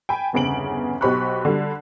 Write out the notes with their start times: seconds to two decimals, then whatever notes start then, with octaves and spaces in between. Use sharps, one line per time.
0.09 G5 G#5 B5
0.33 G1 E2 C#3 C4 D7 F#7
1.01 B1 G4 C5 B5 C#6 F#6
1.45 D3 G3